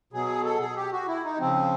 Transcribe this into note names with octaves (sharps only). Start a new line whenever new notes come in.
B2 F#3 G#4
A4
G#4
G4
F#4
E4
D#4
C#3 F3 C4